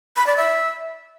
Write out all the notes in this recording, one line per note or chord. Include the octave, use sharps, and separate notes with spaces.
B5
D5
E5